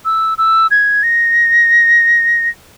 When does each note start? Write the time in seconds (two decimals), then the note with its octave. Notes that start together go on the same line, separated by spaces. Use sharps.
0.05 E6
0.38 E6
0.71 G#6
1.03 A#6